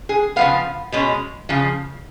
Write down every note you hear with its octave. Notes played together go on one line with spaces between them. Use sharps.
G#4
C#3 F3 B3 F5
B2 G#3 C#4
C#3 F3